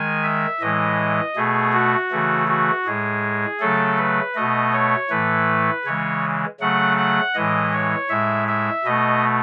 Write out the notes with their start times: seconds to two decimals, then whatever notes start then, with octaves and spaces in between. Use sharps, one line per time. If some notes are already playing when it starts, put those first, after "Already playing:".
Already playing: D#3 G#3 G#5
0.24 E5
0.60 A2 E3 G#3 D#5
1.36 B2 A3 G#4
1.73 F#4
2.11 C#3 E3 A3
2.48 F#4
2.85 A2 G#3 G#4
3.60 C#3 F#3 A3 A4
3.98 B4
4.35 B2 A3 D#5
4.72 C#5
5.10 A2 E3 A3 B4
5.85 C#3 E3 G#3 C#5
6.60 C#3 F#3 A3 F#5
6.97 F#5
7.35 A2 E3 G#3 D#5
7.73 C#5
8.09 A2 G#3 E5
8.48 E5
8.84 B2 A3 D#5